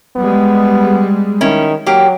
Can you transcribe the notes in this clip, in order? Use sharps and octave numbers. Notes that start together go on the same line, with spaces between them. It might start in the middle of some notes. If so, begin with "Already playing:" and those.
G3 G#3 B3
D#3 C#4 E4
F#3 A#3 G4